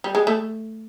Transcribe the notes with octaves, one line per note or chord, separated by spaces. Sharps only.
G3
G#3
A3